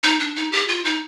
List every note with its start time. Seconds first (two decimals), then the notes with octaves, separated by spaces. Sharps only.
0.03 D#4
0.20 D4
0.36 D#4
0.52 G4
0.68 F4
0.85 D#4